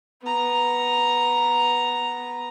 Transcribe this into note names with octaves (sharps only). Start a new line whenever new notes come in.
B3 A#5